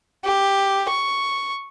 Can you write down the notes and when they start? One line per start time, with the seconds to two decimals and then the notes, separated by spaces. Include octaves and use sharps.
0.24 G4
0.89 C#6